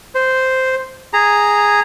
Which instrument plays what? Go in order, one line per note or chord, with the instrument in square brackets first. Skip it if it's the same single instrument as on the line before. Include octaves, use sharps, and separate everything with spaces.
[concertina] C5
G#4 A#5